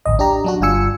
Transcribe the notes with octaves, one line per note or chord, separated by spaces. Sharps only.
A1 D2 D#5
D4 G4 A#5
F#3 D4 F#4
G1 G2 F4 G#5 E6 C#7